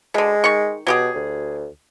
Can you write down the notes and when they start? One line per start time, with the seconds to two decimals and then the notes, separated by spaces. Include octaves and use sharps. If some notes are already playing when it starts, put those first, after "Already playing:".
0.14 B2 D3 G#3
0.44 D#3 C#6
0.87 B2 F#3 G4 G#4
1.15 D2